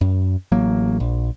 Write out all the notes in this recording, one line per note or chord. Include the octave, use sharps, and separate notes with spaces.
F#2
A1 F#3 A#3
A#1